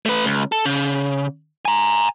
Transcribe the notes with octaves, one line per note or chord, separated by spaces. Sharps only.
A3 B4
C#2
A4
C#3
G#5 A#5